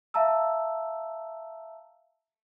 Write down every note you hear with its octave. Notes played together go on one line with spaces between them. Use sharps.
E5 F5 A5 A#5 E6